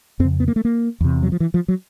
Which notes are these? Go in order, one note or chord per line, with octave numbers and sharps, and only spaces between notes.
F2 C#3 C4
B3
A#3
A3
A#3
E2 C3
F#3
F3
E3
F3
F#3